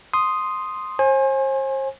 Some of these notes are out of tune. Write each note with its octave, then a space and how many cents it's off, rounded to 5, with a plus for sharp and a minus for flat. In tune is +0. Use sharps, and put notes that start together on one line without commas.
C6 +0 D#6 +0
C5 +40 G#5 +0